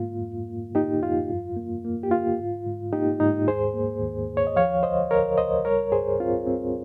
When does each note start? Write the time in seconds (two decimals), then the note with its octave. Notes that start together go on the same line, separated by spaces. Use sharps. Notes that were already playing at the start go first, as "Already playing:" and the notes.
Already playing: G#2 A#3 F4
0.20 F2
0.48 A#3
0.75 A#3 D#4 G4
1.02 F2 F4
1.30 G2
1.57 A#3
1.85 A#3
2.03 G4
2.11 A#3 F4
2.39 G#2
2.66 G#2
2.93 A#3 D#4 G4
3.20 G#2 D#4
3.48 D#2 G#4 C5
3.74 A#3
4.02 D#2
4.29 D#2
4.37 C#5
4.47 D#5
4.56 F3 C#5 F5
4.83 C#2 C5 D#5
5.11 C#2 A#4 C#5
5.38 C#2 C5 D#5
5.65 G3 A#4 C#5
5.92 G2 G#4 C5
6.20 C4 F4
6.47 C4